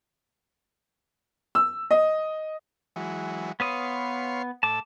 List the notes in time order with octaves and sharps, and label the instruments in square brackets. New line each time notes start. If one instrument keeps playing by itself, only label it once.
[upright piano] E6
D#5
[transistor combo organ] E3 F#3 G#3
[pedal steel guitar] B3 B4 D#6 [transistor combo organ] C#5 F5 C6
[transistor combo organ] A2 [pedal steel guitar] A5 D6